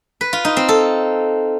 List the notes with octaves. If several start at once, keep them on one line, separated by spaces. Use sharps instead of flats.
B4
F4
D#4
C4
A4